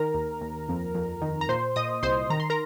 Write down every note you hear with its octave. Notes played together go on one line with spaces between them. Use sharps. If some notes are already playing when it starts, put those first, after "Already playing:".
Already playing: D#3 A#4 A#5
D#2
D#2
F2
F2
D#3
A#5
A#2 C5 C6
A#2 D#5 D#6
C2 C5 C6
D#3 A#5
C6
A#4 A#5